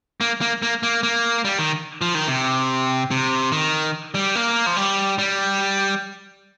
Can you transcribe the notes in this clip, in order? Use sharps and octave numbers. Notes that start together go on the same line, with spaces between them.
A#3
A#3
A#3
A#3
A#3
G3
D#3
F3
D#3
C3
C3
D#3
G3
A#3
F3
G3
G3